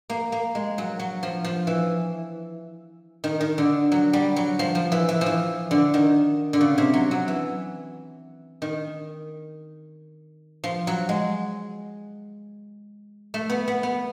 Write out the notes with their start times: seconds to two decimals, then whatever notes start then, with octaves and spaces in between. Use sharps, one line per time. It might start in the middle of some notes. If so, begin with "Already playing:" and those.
0.10 A#3
0.32 A#3
0.55 G#3
0.78 F#3
0.99 F#3
1.23 F3
1.44 F3
1.67 E3
3.24 D#3
3.41 D#3
3.58 D3
3.92 F#3
4.13 G3
4.36 F#3
4.59 F3
4.75 F3
4.92 E3
5.09 E3
5.21 F3
5.26 E3
5.71 D3
5.94 D#3
6.53 D3
6.61 C#3
6.78 C3
6.94 F#3
7.11 F#3
7.28 E3
8.62 D#3
10.64 F3
10.87 F#3
11.09 G#3
13.34 A3
13.50 B3
13.68 B3
13.83 B3